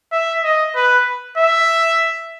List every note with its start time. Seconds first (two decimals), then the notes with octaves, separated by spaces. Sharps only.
0.12 E5
0.43 D#5
0.75 B4
1.37 E5